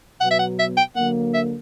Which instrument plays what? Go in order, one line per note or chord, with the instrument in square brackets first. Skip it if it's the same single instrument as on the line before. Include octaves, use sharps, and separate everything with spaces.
[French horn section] B2 F#3 B3 [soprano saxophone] F#5
[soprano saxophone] E5
F#5
E5
G5
[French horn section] D3 F#3 A#3 [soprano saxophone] F#5
[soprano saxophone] E5